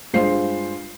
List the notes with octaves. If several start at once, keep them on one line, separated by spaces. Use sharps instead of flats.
G2 G#3 F4 C5 C7